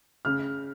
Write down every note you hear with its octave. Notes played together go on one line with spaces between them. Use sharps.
C#3 F6